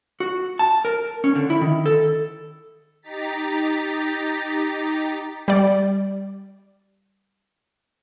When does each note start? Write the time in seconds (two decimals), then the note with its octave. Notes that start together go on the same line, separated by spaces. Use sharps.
0.20 F#4
0.59 A5
0.85 A#4
1.24 C#4
1.35 D3
1.50 E4
1.61 D#3
1.86 A4
3.02 D#4 G4 A#5 A6 B6
5.48 G3 D5